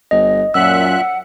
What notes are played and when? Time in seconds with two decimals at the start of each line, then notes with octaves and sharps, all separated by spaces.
0.11 G1 D#5
0.54 F#2 A#2 E5 F#5 E6 F#6